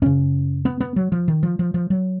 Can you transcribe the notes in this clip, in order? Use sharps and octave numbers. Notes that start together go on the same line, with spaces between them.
F#2 C#3 C#4
B3
B3
F#3
F3
D#3
F3
F3
F3
F#3